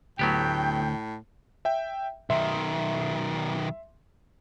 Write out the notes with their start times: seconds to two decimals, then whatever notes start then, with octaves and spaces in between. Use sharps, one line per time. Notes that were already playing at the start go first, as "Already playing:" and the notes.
0.19 D2 A2 F#3 B3 G4 G5
1.65 E5 G5
2.30 B1 D#3 E5 C6